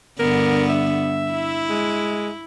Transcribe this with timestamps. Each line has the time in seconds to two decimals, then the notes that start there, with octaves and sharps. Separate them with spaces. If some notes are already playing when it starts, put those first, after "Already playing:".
0.20 G2 D3 B3 A#4
0.70 E5
1.31 E4
1.69 G#3